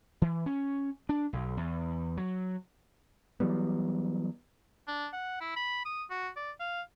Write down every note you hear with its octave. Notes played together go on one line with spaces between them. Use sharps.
E3
C#4
D4
B1
E2
F#3
E3 F#3 G3 B3
D4
F#5
E4
B5
D#6
F#4
D5
F5